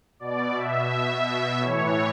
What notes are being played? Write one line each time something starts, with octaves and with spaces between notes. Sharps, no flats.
B2 D5
B2 E5
B2 E5
B2
A2 E3 C#5